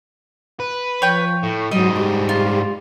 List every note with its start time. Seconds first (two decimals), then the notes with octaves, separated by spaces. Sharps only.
0.60 B4
1.02 F3 C#5 G5
1.43 A2
1.71 G#2 F#3 G3 D#5
1.97 G4
2.29 F4